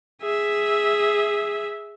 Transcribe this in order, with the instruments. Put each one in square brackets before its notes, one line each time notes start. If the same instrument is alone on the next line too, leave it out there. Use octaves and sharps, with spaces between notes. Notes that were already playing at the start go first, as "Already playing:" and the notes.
[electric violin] G#4 E5